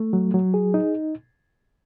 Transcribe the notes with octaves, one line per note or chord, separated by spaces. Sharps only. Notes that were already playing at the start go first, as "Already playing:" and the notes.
Already playing: A3
F#3
F#3
G#4
D#4